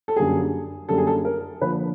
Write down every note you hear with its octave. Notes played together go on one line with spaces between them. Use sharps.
A4
F#2 D3 G3 A#3 G#4
F#2 D3 G3 A#3 A4
G#4
A4
A#4
D3 F3 A#3 B4